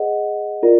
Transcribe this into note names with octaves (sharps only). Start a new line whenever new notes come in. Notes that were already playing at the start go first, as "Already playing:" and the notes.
Already playing: G#4 B4 D#5 F#5
F4 A#4 D5